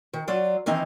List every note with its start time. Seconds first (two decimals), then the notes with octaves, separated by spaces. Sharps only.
0.13 D#3
0.28 F#3 F4 D5
0.66 D#3 E3 C4 D#4